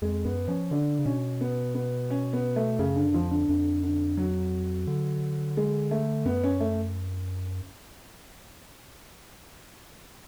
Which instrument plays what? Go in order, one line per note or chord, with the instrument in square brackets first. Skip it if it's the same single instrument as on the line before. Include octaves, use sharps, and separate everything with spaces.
[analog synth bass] F2 [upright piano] G#3
[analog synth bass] F#2 [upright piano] B3
[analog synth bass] F3 [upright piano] C#4
[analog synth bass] D3 [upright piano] D4
[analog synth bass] C#3
[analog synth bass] B2 [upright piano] C#4
[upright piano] B3
B3
C#4
B3
A3
[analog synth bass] F#2 [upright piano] C#3
[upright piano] D3
[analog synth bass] F2 [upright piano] F3
[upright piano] D3
[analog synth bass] F2 [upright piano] D3
[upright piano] D3
F#3
[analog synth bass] D3
[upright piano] G#3
A3
[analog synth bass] F#2 [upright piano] B3
[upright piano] C#4
A3